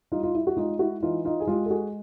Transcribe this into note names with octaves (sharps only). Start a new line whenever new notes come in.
G3 D#4 F4
F4
E4
F#4
G#3 D#4 F4
E4 F#4
E3 D#4 F4
D#4 F4
G#4
G#3 F4 G4
A4
F#4 G#4